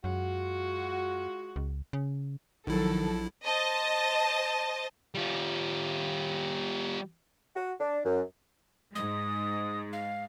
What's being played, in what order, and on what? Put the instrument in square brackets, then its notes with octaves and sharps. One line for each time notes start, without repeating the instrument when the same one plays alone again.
[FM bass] F#2 [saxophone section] G#3 F4 F#4
[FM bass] C#2
C#3
[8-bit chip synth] A#1 E4 [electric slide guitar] D#3 [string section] F3 A4 [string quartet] F#3
[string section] C5 D#5 A5
[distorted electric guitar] G3 F4
[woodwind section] F#4
D4
F#2
[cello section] G#2 G#3 [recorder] D#6
[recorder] F5